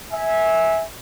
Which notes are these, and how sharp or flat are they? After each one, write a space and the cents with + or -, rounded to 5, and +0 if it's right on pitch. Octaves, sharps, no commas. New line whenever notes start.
E5 -15 G#5 +0